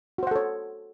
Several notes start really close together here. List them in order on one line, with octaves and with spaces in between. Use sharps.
F#4 C5 F#5 A4 C#5